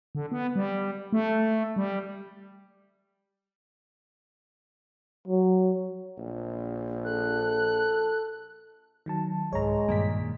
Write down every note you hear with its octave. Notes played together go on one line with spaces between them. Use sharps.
D3
B3
G3
A3
G3
F#3
A#1
A4 F#6
D#3 F#3 A5
C2 G#2 G#3 C#5 A#5
G2 A#2 D#3 A#3 B6